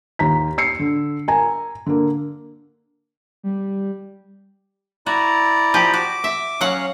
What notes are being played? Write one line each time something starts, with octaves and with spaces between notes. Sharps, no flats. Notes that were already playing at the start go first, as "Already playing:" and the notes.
D#2 A#5 B6
E6 C7 C#7
D3
A#4 G#5 A#5
D3 A#3
G3
E4 F#4 D5 A#5
F3 G4
F#4 D6
E5
F#3 C#4 F5 F#5